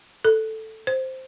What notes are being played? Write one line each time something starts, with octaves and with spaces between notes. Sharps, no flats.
A4
C5